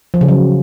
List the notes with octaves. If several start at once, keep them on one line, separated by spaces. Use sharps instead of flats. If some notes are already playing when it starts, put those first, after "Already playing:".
F3
C#3
F#3